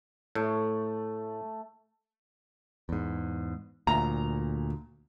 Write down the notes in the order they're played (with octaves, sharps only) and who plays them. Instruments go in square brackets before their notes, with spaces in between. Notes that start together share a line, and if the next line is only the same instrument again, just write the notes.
[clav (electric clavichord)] A2 [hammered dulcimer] A3
[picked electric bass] E2 G#2
[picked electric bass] D2 A#2 [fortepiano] A#5